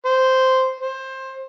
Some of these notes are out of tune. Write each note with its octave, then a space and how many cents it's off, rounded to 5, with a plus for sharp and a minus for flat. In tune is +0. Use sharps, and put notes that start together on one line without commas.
C5 -5
C5 +20